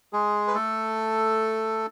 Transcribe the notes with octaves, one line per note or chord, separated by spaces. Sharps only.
G#3 G#4
B4
A3 A4